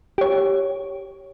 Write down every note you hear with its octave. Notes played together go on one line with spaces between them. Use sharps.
G4 C#5